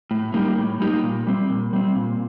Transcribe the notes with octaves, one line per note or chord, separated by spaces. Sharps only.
A2
G3 A#3 D#4 G4
A2
G3 A#3 D#4 G4
A#2
G3 C4
A#2
G3 C4
A#2